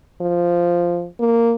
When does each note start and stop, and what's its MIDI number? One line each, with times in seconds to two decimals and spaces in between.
0.21 1.07 53
1.19 1.54 58